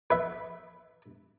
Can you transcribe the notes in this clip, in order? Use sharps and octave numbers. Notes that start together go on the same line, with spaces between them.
B4 E5